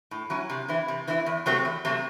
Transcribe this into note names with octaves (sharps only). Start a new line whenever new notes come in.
A2
F#3 C#4 E4
C3
E3 C4 E4
C3
E3 C4 E4
E2
C3 F#3 A3 C4
E2
C3 F#3 A3 C4